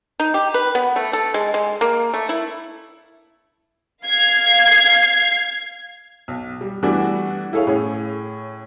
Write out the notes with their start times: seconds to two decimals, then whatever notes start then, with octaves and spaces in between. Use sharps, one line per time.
0.20 D#4
0.34 G4
0.54 B4
0.75 B3
0.96 A3
1.13 A4
1.34 G#3
1.54 G#3
1.81 A#3
2.14 A3
2.29 E4
4.05 F5 G#6 C7
6.28 B1
6.61 G3
6.83 E3 G3 A3 B3 D4 F#4
7.53 E4 G#4 A4 C#5 F5
7.67 A2 C#4 G#4